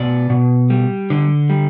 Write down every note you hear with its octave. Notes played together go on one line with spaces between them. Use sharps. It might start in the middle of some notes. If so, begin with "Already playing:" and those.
Already playing: B2 D5
B2
G3
D3
G3